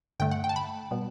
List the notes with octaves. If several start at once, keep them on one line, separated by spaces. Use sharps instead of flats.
G2 D3 A3 G5
F#5
G5
A5
B5
B2 G3 B3